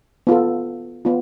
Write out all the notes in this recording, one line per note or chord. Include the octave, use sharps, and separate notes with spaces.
B3 F4 A4
B3 F4